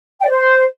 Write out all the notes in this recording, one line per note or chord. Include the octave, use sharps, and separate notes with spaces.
G5
D5
C5